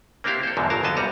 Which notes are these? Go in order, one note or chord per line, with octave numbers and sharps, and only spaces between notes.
A#3 C4 D4 E4 G4 F5
A4 C5
E2 G#2 B2 D3 F3 F#3
G1 F#3 A#4 F5 A5 A#5
F2 D3 B3 D#5 A5
C2 G3 F#4 A#5